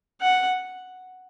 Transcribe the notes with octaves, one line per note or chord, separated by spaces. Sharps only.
F#5